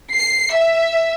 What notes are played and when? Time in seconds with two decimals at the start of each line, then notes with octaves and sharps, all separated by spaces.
0.13 C7
0.54 E5